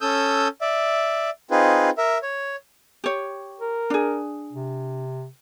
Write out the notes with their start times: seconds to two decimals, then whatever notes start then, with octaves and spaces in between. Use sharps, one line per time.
0.01 C#4 A4 D#6 E6 G6
0.61 D5 E5
1.51 C4 D#4 F4 G#4 B4
1.98 A#4 E5
2.23 C#5
3.04 G4 C#5
3.60 A#4
3.90 D4 G#4
4.53 C3